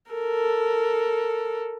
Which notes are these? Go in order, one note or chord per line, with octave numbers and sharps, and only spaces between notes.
A4 A#4